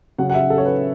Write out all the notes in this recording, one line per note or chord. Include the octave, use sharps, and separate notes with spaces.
C#3 F#3 C#4 F#5
F#5
E5
A4
C#5
B4